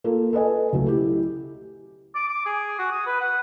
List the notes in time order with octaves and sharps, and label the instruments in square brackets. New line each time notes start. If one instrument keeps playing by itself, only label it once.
[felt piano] A#3 F4 A4
A4 B4 D#5 G#5
C#2 F#3 A3
E4 G4
[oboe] D6
D6
G#4
F#4
D#6
B4
F#5